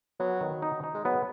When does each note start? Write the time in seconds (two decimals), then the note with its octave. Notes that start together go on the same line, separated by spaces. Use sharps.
0.20 F#3 B3
0.41 D#3
0.62 D#4
0.84 D#4
0.95 G#3
1.05 F#3 B3